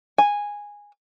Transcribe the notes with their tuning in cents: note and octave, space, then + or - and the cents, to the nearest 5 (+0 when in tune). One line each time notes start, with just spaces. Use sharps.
G#5 -10